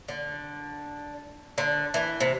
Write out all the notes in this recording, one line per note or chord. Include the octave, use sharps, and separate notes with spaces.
D3
D3
E3
C3